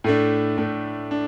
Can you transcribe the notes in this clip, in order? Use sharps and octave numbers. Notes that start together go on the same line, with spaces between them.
A2 A3 D4
A2 A3 D4
D4